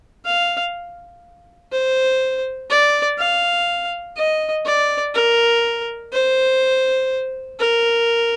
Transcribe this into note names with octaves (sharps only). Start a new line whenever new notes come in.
F5
C5
D5
F5
D#5
D5
A#4
C5
A#4